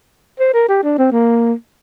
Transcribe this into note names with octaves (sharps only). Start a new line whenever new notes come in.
C5
A#4
G4
D4
C4
A#3